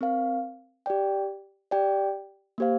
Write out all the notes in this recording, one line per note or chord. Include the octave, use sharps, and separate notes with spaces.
C4 A#4 F5
G4 D5 G5
G4 D5 G5
A#3 G4 C5 F5